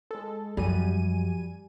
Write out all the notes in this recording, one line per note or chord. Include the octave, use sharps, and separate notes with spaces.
G#3 A4
F#2 F3 G3 G#5 D#7